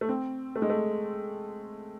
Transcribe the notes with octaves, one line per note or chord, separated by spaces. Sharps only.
A3
C4
A3
G#3
A3